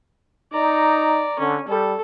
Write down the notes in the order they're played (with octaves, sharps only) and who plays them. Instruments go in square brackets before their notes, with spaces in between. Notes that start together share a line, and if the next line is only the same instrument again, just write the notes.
[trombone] D#4 [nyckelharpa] D5 A#5
[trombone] D3 [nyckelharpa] C#4
[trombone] G3 [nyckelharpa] A4